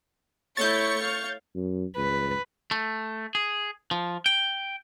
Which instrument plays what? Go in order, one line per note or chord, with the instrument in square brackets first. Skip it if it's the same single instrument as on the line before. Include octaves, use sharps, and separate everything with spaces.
[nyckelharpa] A3 E4 [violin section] C#5 C#6 C#7 [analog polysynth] G6 A6
[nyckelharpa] F5
[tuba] F#2
[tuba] C#2 [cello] B4
[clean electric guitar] A3
G#4
F3
G5